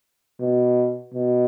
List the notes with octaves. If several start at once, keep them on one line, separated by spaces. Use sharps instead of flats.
B2
B2